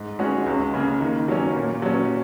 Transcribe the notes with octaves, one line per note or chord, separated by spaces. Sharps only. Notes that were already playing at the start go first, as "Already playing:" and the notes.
Already playing: G#2
G#3 C#4 F#4
C#2
C#3 A#3
D#3
F#3 A#3 C#4
A#2
F#3 C#4